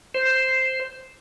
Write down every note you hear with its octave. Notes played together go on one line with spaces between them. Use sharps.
C5